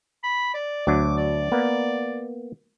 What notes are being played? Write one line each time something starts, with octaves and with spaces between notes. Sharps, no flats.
B5
D5
D2 F#3 D4 D6
D5
A#3 B3